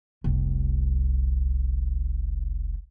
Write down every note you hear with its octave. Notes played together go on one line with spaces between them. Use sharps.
F1 C2